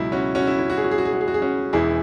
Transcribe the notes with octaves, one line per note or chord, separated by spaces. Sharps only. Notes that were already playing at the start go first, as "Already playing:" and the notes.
Already playing: C#2 B2 F#3 E4
C#4 F#4
C#4 F#4
E4
E4
F#4
G#4
F#4
G#4
F#4
G#4
F#4
G#4
F#4
G#4
C#4 F#4
E1 E2 E3 E4 G#4